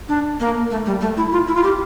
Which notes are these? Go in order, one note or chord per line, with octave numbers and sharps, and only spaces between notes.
D4
A#3
A3
G3
A3
E4
F4
E4
F4
G4